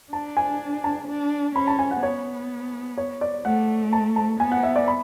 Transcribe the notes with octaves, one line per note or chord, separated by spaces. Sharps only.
D4 A5
G#5
A5
D4
C#4 B5
A5
G#5
F#5
B3 C#5
C#5
D5
A3 F#5
A5
A5
B3 G#5
F#5
E5
D5
B5